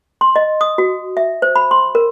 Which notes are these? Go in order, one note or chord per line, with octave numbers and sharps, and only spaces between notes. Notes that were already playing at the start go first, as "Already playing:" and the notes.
C6
D#5
D#6
F#4
E5
C5
B5
C6
A#4